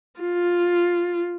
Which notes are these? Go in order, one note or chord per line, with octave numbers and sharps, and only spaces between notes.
F4